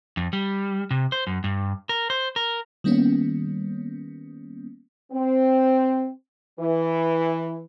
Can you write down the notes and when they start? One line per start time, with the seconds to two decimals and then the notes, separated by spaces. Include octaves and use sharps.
0.17 F2
0.33 G3
0.91 C3
1.12 C5
1.27 F#2
1.44 G2
1.89 A#4
2.10 C5
2.36 A#4
2.84 D#3 G3 A#3 B3 C#4
5.12 C4
6.59 E3